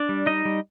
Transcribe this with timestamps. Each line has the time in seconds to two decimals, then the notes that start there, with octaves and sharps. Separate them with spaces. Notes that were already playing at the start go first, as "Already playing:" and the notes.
Already playing: D4 D5
0.09 G3
0.26 G3 D#4 D#5
0.45 G3